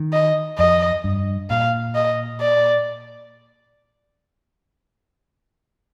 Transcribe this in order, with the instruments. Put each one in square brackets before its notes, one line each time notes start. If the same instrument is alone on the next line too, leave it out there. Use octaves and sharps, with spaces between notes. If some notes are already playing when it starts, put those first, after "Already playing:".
Already playing: [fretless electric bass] D#3
[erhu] D#5
[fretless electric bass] F2 [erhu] D#5
[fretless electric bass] G2
[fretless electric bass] A#2 [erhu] F5
[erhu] D#5
D5